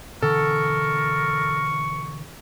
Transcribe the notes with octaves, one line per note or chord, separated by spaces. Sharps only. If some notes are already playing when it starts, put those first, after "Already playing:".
B2 D3 E3 A4 A#4 C#6